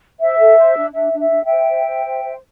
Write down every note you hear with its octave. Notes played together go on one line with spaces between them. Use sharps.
C5 E5
A4
C5
D4
D4 E5
D4
E5
D4
E5 G5
C5
C5
C5
C5
C5